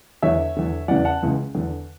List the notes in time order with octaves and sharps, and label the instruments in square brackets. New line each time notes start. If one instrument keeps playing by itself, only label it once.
[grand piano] E2 D3 C#5 E5
E2 D3
E2 C#3 E3 D5 F#5
F#5 A5
C#2 C#3 E3
E2 D3